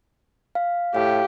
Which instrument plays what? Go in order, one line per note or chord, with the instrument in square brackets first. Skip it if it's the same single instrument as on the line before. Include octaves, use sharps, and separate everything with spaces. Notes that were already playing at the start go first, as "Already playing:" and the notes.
[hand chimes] F5
[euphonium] A2 [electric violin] G4 [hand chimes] F5 G5